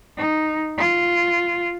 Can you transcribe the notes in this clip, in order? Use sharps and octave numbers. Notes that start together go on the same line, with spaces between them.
D#4
F4